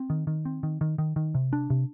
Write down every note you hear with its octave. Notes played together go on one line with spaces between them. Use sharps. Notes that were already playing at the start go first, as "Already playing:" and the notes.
Already playing: C4
D#3
D#3
C4
D#3
D#3
D#3
D#3
C3
D4
C3